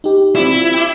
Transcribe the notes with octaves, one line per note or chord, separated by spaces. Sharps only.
D#4 G4
C4 E4 F4 D5
G5 D6